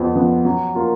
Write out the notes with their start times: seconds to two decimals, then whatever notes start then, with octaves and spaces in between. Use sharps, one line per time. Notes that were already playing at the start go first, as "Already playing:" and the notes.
Already playing: F2 F3 B3
0.15 F3 B3
0.45 F#3
0.75 A#3 F4